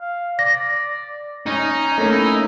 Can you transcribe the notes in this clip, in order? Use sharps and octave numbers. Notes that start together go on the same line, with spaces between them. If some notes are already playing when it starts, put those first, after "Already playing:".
F5
D5 A#6
C#4 D#4
A3 A#3 C#4 A#5
E4